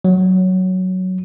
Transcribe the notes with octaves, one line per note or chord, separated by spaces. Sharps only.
F#3